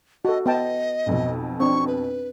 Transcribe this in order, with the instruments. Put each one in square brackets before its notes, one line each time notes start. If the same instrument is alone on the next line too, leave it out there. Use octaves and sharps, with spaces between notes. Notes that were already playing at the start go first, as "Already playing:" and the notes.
[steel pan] F#4 A4 [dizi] D#5
[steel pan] B3 G5 A5 [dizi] D#5
[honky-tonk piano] B1 F2 B2
[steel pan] C4 D4 [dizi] C#6
[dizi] B4